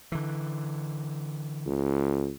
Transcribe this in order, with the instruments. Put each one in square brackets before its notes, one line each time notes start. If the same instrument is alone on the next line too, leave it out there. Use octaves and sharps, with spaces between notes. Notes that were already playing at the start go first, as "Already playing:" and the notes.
[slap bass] D3 E3
[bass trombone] C#2